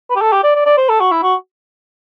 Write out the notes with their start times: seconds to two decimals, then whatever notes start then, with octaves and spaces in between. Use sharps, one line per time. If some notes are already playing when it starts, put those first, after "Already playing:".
0.10 B4
0.16 G4
0.21 A4
0.32 G4
0.44 D5
0.55 D5
0.66 D5
0.77 C5
0.89 A4
1.00 F#4
1.12 E4
1.23 F#4